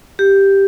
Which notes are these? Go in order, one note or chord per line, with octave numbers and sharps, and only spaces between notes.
G4